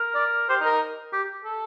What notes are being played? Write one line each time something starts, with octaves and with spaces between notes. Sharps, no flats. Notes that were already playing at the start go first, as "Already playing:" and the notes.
Already playing: A#4
D5
G4 C5
D#4
A#4
D#4
G4
A4